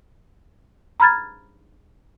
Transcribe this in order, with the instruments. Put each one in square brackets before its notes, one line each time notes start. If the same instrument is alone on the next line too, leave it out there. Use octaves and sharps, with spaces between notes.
[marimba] A#5 B5 F6 G#6 A6